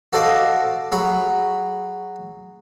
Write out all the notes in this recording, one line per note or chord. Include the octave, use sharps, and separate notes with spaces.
F#4 A4 C5 D5 D#5 F5
F#3 G#4 B5 C#6